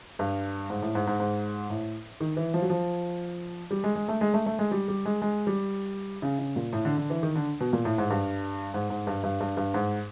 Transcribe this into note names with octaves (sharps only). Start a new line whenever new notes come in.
G2
G#2
A2
G#2
G#2
G#2
A2
D#3
E3
F3
F#3
F3
G3
G#3
G#3
A3
G#3
A3
A3
G#3
G3
G3
G#3
G#3
G3
C#3
C#3
A#2
A2
D3
D3
E3
D#3
D3
B2
A#2
A2
G#2
G2
G#2
G#2
G2
G2
G2
G2
G#2